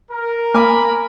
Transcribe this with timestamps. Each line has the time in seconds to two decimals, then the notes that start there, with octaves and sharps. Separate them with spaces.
0.10 A#4
0.54 A#3 G#5 B5 D6